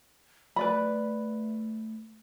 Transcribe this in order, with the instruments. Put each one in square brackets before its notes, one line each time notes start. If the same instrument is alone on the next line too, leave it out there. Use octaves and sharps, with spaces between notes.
[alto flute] A3 [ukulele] B4 D5 B5